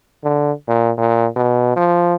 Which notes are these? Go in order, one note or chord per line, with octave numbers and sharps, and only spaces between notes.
D3
A#2
A#2
B2
F3